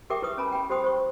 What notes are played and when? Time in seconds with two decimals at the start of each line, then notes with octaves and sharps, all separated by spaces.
0.10 G4 A#4 E5 G5 D6 D#6
0.22 E4 B4 C#6 D#6
0.38 C#4 G#5 A#5 B5
0.52 G5 B5
0.70 G4 C5 G5 C6 D#6
0.84 C5 C#6